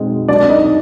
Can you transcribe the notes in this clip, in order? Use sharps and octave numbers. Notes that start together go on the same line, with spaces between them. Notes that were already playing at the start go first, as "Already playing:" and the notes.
Already playing: B2 G#3 C4 D#4
C2 D4 D5
D#4 D#5